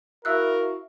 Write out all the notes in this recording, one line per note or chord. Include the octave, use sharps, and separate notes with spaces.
E4 F#4 A#4 E5 F5 E6 F#6